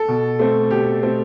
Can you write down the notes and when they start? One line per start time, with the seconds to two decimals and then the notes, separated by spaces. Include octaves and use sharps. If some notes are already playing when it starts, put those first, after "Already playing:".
Already playing: A4
0.08 B2
0.39 A3 C4
0.71 B2 G4
1.03 A3 C4